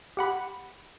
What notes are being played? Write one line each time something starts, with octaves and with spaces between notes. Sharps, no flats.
G4 F#5 B5